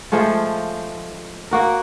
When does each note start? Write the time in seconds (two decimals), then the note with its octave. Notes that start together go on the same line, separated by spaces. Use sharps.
0.12 F3 G#3 A3 F4
1.51 A#3 F#4 A#4